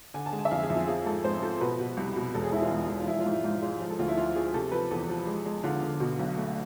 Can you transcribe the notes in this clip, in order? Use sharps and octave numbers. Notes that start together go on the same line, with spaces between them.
D3 G#5
A5
G#3
G#5
E5
F2 F5
G#4
F2
F4
F3 G#4
G#2 A4
G#2 C5
F3 A4
B2 B4
B2
C2
B2
E1 A4
G#4
E1 E4
F4
E1
E1
F4
F3 E4
F4
G#2
E4
G#2 F4
G#3 F4
F3
A4
D2 F4
E4
F3 F4
F3 G#4
C3 A4
F3 B4
E2 A4
F3
G#3
G#3
D3 F4
D3
B2
B1
A3